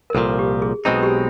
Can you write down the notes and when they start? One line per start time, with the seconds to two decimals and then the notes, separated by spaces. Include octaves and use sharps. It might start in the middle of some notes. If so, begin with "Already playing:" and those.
0.10 A#4
0.15 C2 A#2 F3 A4
0.39 G4
0.62 G#4
0.85 B1 B2 G#3 C4 D#4 G#4
1.03 G4